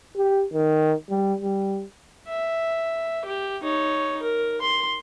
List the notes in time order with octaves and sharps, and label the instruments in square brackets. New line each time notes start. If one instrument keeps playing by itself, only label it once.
[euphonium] G4
D#3
G3
G3
[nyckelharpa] E5
G4
D#4 C#5
A#4
C6